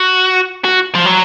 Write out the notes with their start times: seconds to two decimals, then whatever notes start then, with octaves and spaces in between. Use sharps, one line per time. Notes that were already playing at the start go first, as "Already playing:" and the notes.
Already playing: F#4
0.64 F#4
0.95 F3
1.05 F#3